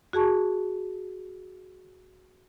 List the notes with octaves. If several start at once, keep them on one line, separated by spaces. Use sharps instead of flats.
F#4 G#4 A5 C#6